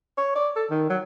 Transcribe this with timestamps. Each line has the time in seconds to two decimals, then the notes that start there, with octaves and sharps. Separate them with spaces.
0.18 C#5
0.36 D5
0.56 A4
0.70 D#3
0.90 F#3